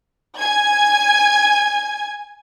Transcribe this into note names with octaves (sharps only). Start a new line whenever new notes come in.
G#5 G#6